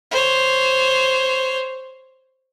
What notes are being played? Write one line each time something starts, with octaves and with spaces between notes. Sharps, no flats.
C5 C#5